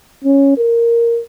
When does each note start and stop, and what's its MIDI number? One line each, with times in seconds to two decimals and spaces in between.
0.24 0.58 61
0.58 1.20 70